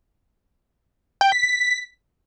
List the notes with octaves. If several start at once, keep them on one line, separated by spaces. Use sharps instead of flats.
G5
B6
B6